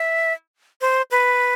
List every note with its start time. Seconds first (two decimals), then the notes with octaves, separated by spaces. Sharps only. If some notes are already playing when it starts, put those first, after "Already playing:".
Already playing: E5
0.81 C5
1.11 B4